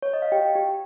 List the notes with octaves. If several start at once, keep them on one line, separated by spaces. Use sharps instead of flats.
C#5
D#5
F5
G4 G5
G4